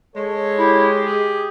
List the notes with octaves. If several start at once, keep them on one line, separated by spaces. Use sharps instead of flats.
G#3 A4 C#5
E4 G4
G#4